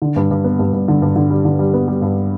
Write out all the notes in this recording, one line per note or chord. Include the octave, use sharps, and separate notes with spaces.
D3
G2
G2
B3
G2
G2
D3
G2
D3
G3
D3
G3
B3
G3
G2